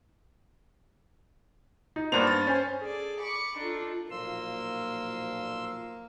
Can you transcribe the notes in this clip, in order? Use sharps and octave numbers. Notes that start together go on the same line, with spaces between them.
D#4
G2 A#3 B3 D4 C5 F7
A6
C#4 C5 G#5
G#4 A4 D5
B5 C#6 D6
D4 D#4 F4 A4
B1 A#2 F3 A#3 C6 E6